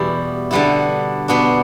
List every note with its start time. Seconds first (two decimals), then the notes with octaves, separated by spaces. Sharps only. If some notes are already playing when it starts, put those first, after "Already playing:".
Already playing: E2 B2 G3 E4 G4
0.51 D3 G3 B3 E4
1.28 B2 B3 D4